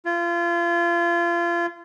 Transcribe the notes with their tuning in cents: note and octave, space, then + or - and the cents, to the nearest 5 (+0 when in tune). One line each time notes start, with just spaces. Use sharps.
F4 -30